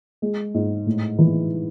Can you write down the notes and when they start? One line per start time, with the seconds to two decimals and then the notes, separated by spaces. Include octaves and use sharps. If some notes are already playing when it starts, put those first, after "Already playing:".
0.22 G#3
0.54 G#2
0.86 A2
1.19 E3